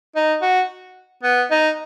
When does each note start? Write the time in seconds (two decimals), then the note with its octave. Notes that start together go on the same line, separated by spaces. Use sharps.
0.16 D#4
0.42 F#4
1.23 B3
1.51 D#4